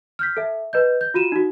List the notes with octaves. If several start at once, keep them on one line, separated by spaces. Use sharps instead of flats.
F6 G6 B6
A4 E5
B4 D#5 G6
G6
F4 F#4 D#7 E7
D#4 F#4